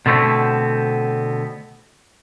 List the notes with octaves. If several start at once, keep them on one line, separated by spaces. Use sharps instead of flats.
B2 D3 A3 B3 C4